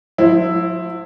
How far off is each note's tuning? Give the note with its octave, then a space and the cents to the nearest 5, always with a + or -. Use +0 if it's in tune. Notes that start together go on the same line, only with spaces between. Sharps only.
F3 +45 E4 +0 C5 +0